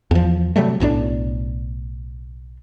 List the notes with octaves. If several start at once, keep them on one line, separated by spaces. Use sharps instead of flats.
E2 F3
C3 F#3 G3 A3
B1 A2 C4 D4